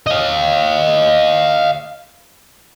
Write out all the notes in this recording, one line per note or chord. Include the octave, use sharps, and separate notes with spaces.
D#5 F5